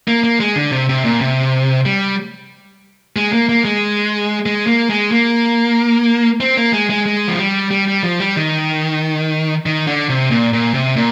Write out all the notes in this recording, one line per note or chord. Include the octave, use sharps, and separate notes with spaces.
A#3
A#3
G#3
D3
C3
C3
A#2
C3
G3
G#3
A#3
A#3
G#3
G#3
A#3
G#3
A#3
C4
A#3
G#3
G#3
G#3
F3
G3
G3
G3
F3
G3
D#3
D#3
D3
C3
A#2
A#2
C3
A#2